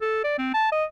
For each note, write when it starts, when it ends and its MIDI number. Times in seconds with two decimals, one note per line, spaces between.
0.01 0.22 69
0.24 0.35 74
0.38 0.54 60
0.54 0.70 81
0.72 0.85 75